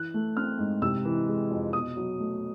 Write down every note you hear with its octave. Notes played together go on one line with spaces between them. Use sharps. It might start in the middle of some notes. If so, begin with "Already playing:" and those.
Already playing: E3 F#6
A3
C4 F6
G#2
C3 E6
E3
G#3
F2
B2 D#6
F#3
A3